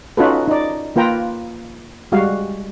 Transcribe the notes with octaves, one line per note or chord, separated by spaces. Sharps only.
C#4 D#4 F4 F#4 A4 B4
D#4 D5
A#3 F4 B4 G5 A#5
G3 G#3 F#4 F5